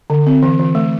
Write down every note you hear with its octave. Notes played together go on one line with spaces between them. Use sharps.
D3
C4
E3
E3
A3